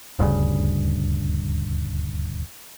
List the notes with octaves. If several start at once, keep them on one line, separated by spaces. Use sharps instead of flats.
D#1 D2 G2 C#3